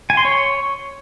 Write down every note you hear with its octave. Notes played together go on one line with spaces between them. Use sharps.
G#5
C6
C#5